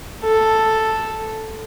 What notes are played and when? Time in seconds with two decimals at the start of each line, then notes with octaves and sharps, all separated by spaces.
0.24 A4